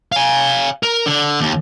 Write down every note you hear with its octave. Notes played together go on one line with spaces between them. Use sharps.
F5 G#5
A#4
D3
D#2